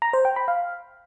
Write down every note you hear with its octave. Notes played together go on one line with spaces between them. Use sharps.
A#5
C5
G5
B5
F5